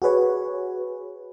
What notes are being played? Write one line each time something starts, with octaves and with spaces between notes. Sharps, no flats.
F#4 G#4 B4 C#5